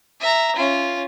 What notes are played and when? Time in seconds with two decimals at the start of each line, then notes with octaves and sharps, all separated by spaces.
0.20 E5 A#5
0.56 C#4 F4